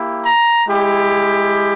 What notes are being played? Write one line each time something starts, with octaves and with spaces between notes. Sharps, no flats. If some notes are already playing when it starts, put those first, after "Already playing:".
Already playing: A#3 E4 G4
A#5
G#3 E4 G4